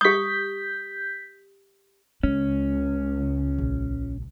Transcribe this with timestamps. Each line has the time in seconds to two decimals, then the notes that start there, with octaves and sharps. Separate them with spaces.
0.01 G4 D#6 G6 B6
2.23 C#2 G#3 C#4
3.58 A#1